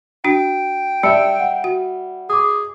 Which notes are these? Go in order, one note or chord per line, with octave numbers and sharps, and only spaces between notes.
D4 F#4 G5
G3 E5 A5 E6 C#7
F#5
F#4
G#4 D6 D#6